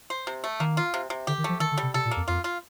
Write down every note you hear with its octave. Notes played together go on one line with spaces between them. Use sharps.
C5
C3
A3
D#3 A#3
F4
C3
C3
D3 G4
D#3
F3 A3
D#3 A4
D3
G3
C3
C3 A4
A#2
A#3
F2
F2 F4
F4